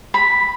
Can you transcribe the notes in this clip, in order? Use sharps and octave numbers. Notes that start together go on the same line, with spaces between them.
B5